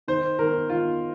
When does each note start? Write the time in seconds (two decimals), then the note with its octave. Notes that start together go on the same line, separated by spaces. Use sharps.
0.08 D#3 C5
0.39 D#3 A#4
0.69 D#3 F4